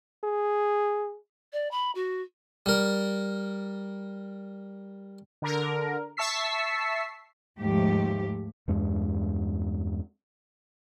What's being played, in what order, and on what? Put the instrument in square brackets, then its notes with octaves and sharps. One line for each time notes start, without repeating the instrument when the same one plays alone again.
[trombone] G#4
[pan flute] D5
B5
F#4
[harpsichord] G3 A#4
[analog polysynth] D3 A#4
E5 A5 C#6 E6 B6 C7
[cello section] D#2 G#2 F3 A3 G4
[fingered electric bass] E2 G2 G#3